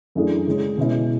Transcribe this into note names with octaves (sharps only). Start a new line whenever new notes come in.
F#2 E3 A3 D4 G#4
C#3 G#3 C#4 G#4
B2 G#3 C#4 E4